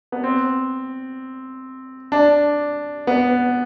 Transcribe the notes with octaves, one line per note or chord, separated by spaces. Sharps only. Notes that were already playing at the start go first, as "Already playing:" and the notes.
B3
C4
D4
B3